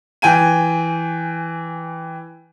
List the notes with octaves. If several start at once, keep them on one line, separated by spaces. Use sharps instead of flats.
E3 G5 G#5 D#7